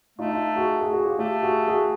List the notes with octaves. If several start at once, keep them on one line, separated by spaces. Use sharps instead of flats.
A3 D#4 F4
D#4 F4
F#4 G#4
F#4 G#4
F#4 G#4
F4 G4
A3 F4 G4
F#4 G#4
F#4 G#4